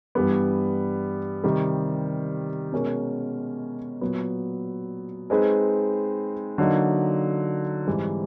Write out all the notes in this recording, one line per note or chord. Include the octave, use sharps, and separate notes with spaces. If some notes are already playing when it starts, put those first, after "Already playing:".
G2 E3 G3 B3
C3 D#3 G3
B2 G#3 C#4 F#4 A#4
A#2 F#3 B3
G#3 C4 D#4 G#4 B4
D3 F#3 A#3 D#4
G#2 E3 G3 C4